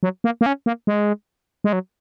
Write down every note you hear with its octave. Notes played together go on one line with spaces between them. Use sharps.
F#3
A#3
A#3
C#4
A#3
G#3
G#3
F#3